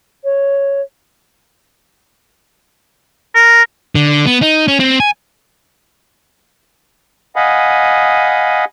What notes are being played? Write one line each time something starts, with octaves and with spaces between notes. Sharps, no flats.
C#5
A#4
D3
B3
D#4
C#4
C4
G#5
D#5 F5 F#5 G#5 B5 D#6